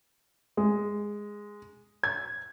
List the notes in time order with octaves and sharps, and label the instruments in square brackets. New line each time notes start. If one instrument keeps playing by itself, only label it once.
[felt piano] G#3
G#6